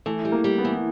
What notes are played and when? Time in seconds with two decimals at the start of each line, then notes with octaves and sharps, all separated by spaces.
0.06 E3 A3
0.25 G3
0.32 A#3
0.44 G3
0.58 B3
0.65 E3
0.73 B3